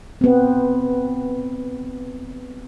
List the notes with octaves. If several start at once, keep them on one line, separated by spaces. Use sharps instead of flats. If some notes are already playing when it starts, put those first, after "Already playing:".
B3 C4